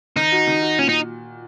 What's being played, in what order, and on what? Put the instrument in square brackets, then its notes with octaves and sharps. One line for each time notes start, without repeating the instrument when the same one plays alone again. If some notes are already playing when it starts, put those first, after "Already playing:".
[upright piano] D#3 [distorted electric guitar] D#4
[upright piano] F#4
D#3
F#4
[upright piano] A#2 [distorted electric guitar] C#4
[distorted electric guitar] D#4